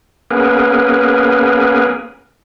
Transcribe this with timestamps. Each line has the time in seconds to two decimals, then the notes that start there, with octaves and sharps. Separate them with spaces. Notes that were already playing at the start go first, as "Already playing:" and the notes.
0.31 A#3 B3 C#4 G#4 A#4 B4